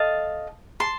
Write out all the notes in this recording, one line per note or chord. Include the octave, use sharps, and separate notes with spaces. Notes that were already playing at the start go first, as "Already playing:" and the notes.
Already playing: A4 D#5 F5 A5
A5 C6